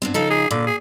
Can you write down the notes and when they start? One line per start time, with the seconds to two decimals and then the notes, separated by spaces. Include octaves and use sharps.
0.02 G2 B3 C4
0.14 C#3 F3 D#4 A4
0.30 G#4
0.51 A#2 D3
0.67 G#4